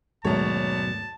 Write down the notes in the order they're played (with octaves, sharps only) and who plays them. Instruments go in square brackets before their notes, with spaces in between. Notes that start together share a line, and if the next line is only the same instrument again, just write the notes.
[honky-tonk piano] G#1 C#5 [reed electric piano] D#2 G#2 A3 [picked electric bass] B2 F#3 [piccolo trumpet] A5